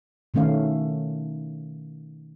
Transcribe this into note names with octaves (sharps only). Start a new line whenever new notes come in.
B2 D#3 A3 C#4 F5